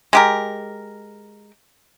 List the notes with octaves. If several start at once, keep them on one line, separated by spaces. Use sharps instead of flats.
G#3 G4 A#4